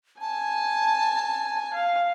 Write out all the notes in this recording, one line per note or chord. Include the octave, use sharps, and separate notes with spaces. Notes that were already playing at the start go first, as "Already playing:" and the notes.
G#5 A5
F5